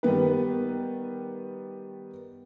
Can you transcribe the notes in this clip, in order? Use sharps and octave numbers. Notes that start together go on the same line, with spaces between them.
D#3 G3 B3 B4